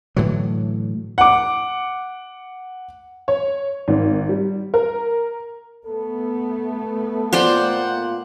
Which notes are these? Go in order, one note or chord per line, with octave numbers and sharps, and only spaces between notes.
A2 D3 E3 F#3
F#5 D6
C#5
G#1
G3
A#4
A3 B3 A4
A#2 F4 C5 D5 F#5 G5